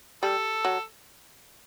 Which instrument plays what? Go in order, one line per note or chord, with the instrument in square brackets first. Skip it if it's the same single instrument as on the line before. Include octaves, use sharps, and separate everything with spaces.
[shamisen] G3 [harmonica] A4
[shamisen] F#3